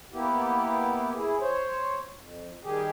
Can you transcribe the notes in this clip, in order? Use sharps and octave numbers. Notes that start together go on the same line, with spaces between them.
A#3 B3 E4 G4
E4 G#4
C5 C#5
F2
D#3 G3 G4 G#4